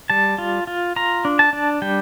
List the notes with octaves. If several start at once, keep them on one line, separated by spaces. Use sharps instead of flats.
G3 A5
F4
F4
F4 A#5
D4
A5
D4
G3 G5